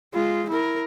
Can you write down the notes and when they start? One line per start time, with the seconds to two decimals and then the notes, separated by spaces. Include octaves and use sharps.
0.14 G#3 F4
0.49 E4 A#4